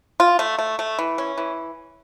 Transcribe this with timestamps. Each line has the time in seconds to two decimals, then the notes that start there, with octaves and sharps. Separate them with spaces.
0.20 F4
0.39 A3
0.59 A3
0.79 A3
0.99 E3
1.18 C#4
1.38 E3